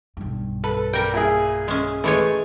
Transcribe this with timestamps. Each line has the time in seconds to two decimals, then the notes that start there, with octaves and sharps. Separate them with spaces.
0.17 B1 G2
0.64 A4 B4
0.93 G3 A#4 G5
1.14 A#2 E4 G#4
1.68 G#3 C#4
2.04 E3 G#3 A3 C#5